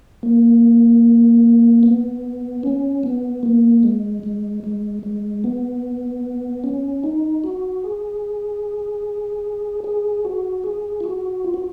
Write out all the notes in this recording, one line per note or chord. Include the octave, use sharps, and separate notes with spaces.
A#3
B3
C#4
B3
A#3
G#3
G#3
G#3
G#3
B3
C#4
D#4
F#4
G#4
G#4
F#4
G#4
F4
F#4
F4
F#4